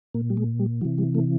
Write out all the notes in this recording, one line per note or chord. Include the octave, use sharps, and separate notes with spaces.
A#2 A#3
G3
G#3
G3
C3 E3 F#3
G3
A3